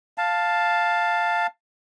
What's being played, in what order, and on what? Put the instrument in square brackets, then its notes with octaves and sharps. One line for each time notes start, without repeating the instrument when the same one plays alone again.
[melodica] F5 A5